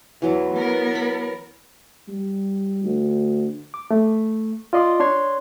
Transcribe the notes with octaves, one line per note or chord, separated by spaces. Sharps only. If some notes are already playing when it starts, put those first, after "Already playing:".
E2 E3 F#3
B3 A#4
B5
G3
D2
D6
A3
F4 D5 D#5 C6 D6
D4 C#5 C6 G#6